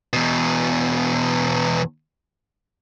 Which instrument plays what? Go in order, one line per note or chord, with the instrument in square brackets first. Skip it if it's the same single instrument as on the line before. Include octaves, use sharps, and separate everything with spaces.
[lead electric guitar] E2 B2